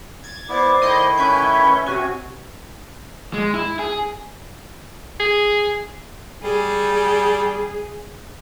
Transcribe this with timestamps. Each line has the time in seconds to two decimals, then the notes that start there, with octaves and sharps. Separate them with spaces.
0.24 G#6 A6
0.49 B3 E4 C5 D5 D6
0.82 D#3 A3 E4 D#5 C6 G6
1.17 C#4 B4 E5 G#5 G6
1.86 C3 F#4 G#5
3.33 G#3
3.54 E4
3.79 G#4
5.20 G#4
6.43 G3 G#4